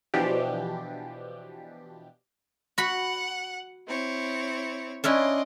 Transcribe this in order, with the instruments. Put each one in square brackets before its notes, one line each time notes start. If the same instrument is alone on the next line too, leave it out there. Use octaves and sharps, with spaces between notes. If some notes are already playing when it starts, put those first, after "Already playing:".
[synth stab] B2 E3 F3 D4 G4
[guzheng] F#4 B5 [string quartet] F#5
[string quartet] C4 E4 C#5
[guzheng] C#4 D4 E4 [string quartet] D5 D#5 C6